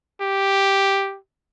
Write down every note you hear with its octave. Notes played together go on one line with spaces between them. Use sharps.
G4